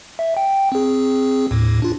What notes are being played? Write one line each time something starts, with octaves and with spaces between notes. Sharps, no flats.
E5
G5
C4 G#4
D#2 A2
D4 F4